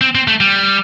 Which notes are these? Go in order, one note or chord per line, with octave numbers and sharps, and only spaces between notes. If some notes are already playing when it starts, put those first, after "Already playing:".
C4
C4
A3
G3